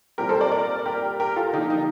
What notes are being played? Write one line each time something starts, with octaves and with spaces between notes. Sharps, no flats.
A#2 G3 C4 G4 A#4
A4 C5
A#4 D5
A#4 D5
G4 A#4
G4 A#4
F4 A4
D3 F3 A#3 D#4 G4
D#4